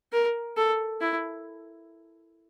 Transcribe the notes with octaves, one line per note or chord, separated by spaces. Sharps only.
A#4
A4
E4